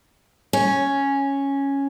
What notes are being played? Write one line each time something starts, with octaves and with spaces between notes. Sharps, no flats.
C#4